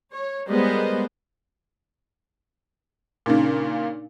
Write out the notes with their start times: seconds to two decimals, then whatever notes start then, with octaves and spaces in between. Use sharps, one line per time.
0.11 C#5
0.49 G3 G#3 B3 A#4 C5 D#5
3.26 A#2 C#3 D4 D#4 D6